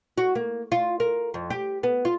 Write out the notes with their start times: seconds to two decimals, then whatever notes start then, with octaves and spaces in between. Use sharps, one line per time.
0.18 F#4
0.35 A#3
0.72 F4
1.00 A#4
1.34 F2
1.50 G4
1.83 B3
2.05 F4